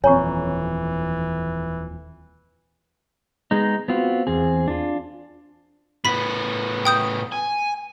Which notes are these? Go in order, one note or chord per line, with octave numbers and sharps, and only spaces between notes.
D#1 F2 E3 C4 C#5 G#5 A#5 C#6
G#3 B3 D#4
B3 C4 F4 F#4
E2 C4 G#4
D4 F4
A2 B3 B5 B6
G5 D#6 G6
G#5